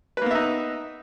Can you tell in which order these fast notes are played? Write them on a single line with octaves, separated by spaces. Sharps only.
B4 A#3 B3 E5 D#4